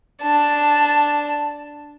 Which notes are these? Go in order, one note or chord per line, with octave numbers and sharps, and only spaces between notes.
D4 A5